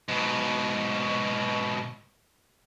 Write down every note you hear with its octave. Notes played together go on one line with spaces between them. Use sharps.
G#2 B2